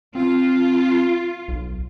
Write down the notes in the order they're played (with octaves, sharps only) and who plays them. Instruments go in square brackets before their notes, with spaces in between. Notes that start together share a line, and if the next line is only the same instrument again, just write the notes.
[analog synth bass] C4 [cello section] F4
[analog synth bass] B1